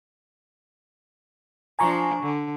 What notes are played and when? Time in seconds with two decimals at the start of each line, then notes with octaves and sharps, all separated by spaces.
1.79 F3 D4 G#5 A#5 C#6
2.23 D3